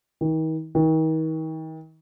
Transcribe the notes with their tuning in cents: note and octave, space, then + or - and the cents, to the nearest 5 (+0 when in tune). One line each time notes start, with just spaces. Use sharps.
D#3 +40
D#3 +40